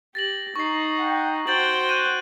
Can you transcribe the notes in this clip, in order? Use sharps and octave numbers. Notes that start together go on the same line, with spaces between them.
G4 A6 A#6 F#7
D#4 C#6 C7
F#5 G5
F#4 C5 G5 G6 A6 F#7
F#6 G6 D#7